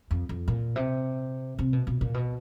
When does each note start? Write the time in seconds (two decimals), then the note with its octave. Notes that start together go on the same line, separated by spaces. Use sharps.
0.11 F2
0.29 F2
0.48 A#2
0.76 C3
1.59 C3
1.73 B2
1.87 B2
2.01 A#2
2.14 B2